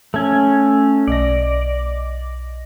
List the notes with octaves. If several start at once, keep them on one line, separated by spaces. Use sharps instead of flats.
A3 C#4 A4 G#6
B1 D5 D#5 A#6